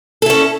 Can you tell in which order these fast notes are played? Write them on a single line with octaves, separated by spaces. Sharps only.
A4 E4 C#4